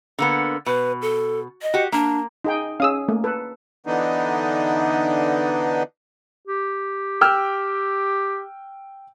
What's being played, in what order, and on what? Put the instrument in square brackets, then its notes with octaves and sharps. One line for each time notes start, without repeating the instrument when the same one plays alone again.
[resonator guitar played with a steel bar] D3 A#3 B3
[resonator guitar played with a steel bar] B2 [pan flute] B4
[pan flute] A4
D#5
[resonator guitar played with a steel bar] F#4 G4
[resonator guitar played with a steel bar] A#3 [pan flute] D4
[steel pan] D#4 G#4 G5
[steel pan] C#4 G#4 [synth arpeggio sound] F5 D#6 E6
[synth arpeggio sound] A3 [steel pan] A#3
[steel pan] A4 B4
[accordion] D3 E3 B3 D4 D#4
[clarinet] G4
[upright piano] G5 E6 F6